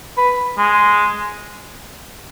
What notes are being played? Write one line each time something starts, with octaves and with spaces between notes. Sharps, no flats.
B4
G#3